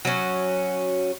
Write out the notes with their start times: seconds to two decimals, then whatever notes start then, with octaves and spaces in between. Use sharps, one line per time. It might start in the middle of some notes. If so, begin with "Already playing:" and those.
0.05 F#3 C#4